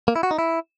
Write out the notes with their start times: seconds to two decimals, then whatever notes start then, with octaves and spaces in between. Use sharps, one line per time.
0.08 A#3
0.16 E4
0.23 F#4
0.31 D#4
0.39 E4